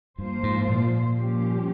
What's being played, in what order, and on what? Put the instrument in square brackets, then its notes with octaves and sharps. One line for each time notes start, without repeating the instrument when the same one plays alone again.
[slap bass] G2 [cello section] F3 A#3 F4 C5
[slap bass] G#2
A#2
[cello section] G2 F3 A#3 C#4 G4